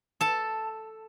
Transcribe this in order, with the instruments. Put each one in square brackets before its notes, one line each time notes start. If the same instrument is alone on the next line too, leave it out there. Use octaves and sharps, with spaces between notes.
[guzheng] A4 A5